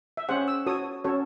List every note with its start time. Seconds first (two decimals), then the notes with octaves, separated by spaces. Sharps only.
0.17 E5
0.29 C#4 G#4 C5 F#5
0.48 E6
0.67 F#4 A4 C#5 D#6
1.04 C#4 F#4 A4 C#5